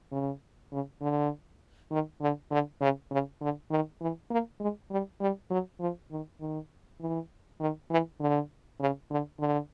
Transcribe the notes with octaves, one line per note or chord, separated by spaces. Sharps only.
C#3
C#3
D3
D#3
D3
D3
C#3
C#3
D3
D#3
E3
A#3
G#3
G3
G3
F#3
F3
D#3
D#3
E3
D#3
E3
D3
C#3
D3
D3